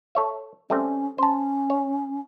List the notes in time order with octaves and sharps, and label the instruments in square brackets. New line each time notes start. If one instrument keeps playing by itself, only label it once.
[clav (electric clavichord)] A4 C#5 E5
[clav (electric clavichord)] G3 A3 C4 [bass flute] C#4
[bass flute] C#4 [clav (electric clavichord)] C5 A5
[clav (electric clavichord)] C#5